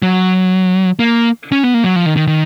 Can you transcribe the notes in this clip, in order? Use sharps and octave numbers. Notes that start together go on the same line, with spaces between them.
F#3
A#3
C#4
B3
A#3
F#3
F3
D#3
D#3
D#3